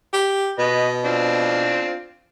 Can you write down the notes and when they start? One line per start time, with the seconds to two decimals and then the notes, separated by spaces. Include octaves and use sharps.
0.13 G4
0.59 B2 B4 D#5
1.05 C4 D4 F4